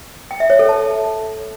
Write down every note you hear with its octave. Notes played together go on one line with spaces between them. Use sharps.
G5
E5
C#5
A4
A5